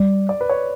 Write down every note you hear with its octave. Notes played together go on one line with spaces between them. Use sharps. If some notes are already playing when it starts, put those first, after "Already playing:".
Already playing: G3 D5
D5
B4
C#5